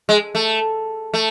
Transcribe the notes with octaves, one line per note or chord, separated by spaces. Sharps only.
G#3
A3
A3